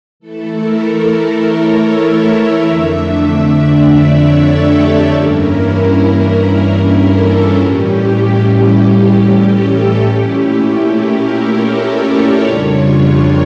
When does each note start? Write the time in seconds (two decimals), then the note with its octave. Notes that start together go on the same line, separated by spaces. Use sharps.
0.20 E3 A3 E4 A4
0.51 A#4
0.81 A#4
1.42 C#5
1.72 A4
2.03 E5
2.34 E5
2.65 F2 D3 A3 D4
3.26 E5
3.56 D5
3.87 C#5
4.18 A4
4.48 G4
4.79 A4
5.09 G2 E3 A#3 C#4 E4 A#4
6.94 A4
7.25 F4
7.54 A2 E3 G3 C#4 G4
9.38 A4
9.99 A#2 A3 C#4 E4 G4
10.61 G4
10.92 A#4
11.22 A4
11.53 C#5
11.83 D5
12.14 E5
12.45 F2 C#3 G3 D4 F4 C#5
12.75 C#5
13.06 A#4